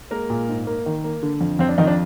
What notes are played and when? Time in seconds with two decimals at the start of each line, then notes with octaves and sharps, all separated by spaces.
0.11 G#3 A#3 A#4
0.30 A#2
0.49 G#2
0.67 A#3
0.86 D#3
1.04 A#3
1.23 D3
1.41 F2
1.59 F2 C4
1.69 D4
1.78 F2 D#3 D#4
1.87 D4